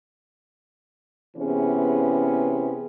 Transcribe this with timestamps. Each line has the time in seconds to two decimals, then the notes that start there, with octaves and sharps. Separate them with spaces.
1.37 C3 E3 B3 C#4 G#4